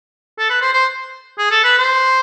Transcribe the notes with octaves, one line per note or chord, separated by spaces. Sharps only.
A4
B4
C5
C5
G#4
A4
B4
C5